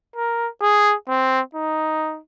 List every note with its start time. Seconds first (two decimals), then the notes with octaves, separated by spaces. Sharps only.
0.16 A#4
0.62 G#4
1.09 C4
1.55 D#4